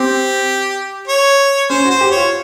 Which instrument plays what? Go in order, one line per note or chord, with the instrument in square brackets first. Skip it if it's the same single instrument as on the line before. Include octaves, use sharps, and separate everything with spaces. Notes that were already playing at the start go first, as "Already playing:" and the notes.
Already playing: [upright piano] C4 [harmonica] G4
[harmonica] C#5
[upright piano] C#4 [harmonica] C5
[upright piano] F#4
[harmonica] C5
[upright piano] G4
[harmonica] C#5
[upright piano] F4